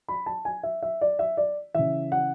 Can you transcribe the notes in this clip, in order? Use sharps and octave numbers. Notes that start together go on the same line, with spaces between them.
B5
A5
G#5
E5
E5
D5
E5
D5
C#3 E3 E5
F#5